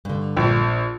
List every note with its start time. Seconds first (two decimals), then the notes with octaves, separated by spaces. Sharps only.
0.05 G2 D3
0.37 A#1